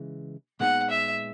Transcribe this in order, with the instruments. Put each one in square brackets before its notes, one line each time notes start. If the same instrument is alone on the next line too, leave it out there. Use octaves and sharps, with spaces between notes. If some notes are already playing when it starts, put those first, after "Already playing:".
Already playing: [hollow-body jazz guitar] C#3 E3 G#3
[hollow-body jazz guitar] A#2 G#3 B3 D#4 G#4 [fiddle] F#5
[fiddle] E5